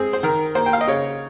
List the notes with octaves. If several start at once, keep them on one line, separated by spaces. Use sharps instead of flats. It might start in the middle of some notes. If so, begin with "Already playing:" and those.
Already playing: G#3 C4 G#4
C5
D#3 A#4
A#3 C5
G5
F5
D#5
C#3 C#5